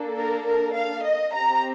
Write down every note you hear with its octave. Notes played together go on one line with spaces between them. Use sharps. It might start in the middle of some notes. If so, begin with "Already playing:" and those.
Already playing: A#3 D4 A4
A#4
A#4
F5
D#5
C4 G4 A#5